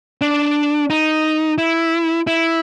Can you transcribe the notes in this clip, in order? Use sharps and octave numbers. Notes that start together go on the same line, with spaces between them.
D4
D#4
E4
E4